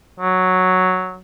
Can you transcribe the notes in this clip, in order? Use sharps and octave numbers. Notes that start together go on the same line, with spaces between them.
F#3